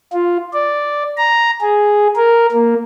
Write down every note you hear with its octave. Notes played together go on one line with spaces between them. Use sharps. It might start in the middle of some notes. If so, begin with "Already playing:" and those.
F4
D5
A#5
G#4
A#4
A#3